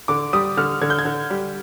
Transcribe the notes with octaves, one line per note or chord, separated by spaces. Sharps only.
D3 D6
G3 D#6
D3 F6
D3 G#6
G6
G#6
D3
G3